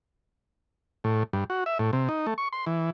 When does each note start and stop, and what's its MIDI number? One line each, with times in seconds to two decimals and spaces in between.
1.04 1.23 45
1.33 1.44 43
1.50 1.64 66
1.66 1.78 76
1.79 1.91 45
1.93 2.09 48
2.09 2.26 63
2.27 2.34 57
2.38 2.48 85
2.53 2.65 84
2.66 2.90 52